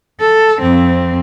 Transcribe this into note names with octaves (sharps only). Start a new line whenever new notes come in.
A4
F2 C4